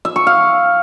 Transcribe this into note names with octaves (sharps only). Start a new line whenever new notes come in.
E5
C#6
F5